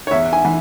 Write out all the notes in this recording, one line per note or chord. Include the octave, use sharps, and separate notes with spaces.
C#5
E2 E5
G#5
E3